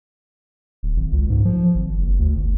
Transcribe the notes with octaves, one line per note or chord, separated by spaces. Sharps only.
D1
G#1
C#2
G#2
F3
G#1
F#1
D2
G1